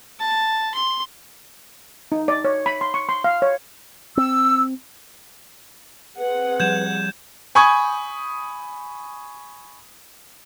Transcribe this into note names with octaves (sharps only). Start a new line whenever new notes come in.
A5
C6
D#4
D5
C#5
B5
C6
C#6
C6
F5
C#5
C4 E6
C4 G#4 B4 F#5
F3 G3 G6 G#6 E7
G#5 B5 C#6 D#6 G#6